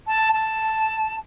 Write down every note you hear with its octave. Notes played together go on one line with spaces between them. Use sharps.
A5
A5